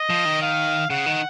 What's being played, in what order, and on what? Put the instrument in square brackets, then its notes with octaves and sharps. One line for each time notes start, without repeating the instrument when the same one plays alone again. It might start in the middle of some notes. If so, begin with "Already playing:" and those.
Already playing: [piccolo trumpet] D#5
[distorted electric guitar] F3
D#3
[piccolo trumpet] F5
[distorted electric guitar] C#3 [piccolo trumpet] F#5
[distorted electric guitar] D#3